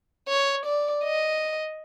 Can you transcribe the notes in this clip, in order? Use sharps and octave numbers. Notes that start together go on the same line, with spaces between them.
C#5
D5
D#5